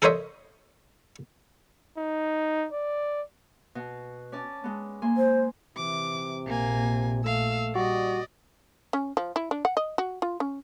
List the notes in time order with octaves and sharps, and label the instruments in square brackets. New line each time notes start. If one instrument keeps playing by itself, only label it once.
[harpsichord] A4 A#4 C5 C#5 D#5 E5
[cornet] D#4
D5
[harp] B2
C#4 D5 A5
G#3 B3
A#3 G#5 C6
[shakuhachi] C5
[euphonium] C3 [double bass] E3 [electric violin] D6
[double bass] A#1 [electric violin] A#3 G#5
[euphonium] A3 [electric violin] F5 E6
[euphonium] G3 [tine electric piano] F#4 [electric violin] D5 D#5
[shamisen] C#4
F3
E4
D4
F#5
D#5
F#4
F4
C#4